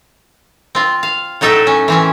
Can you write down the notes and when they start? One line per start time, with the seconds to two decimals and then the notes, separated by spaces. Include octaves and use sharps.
0.75 C4 F4
1.03 F5
1.41 A2 F#3 D#4 A4 E5 G5
1.67 C#4
1.88 E3 C4 C#4